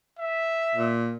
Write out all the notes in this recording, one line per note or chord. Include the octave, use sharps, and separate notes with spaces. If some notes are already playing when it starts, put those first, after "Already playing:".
E5
A#2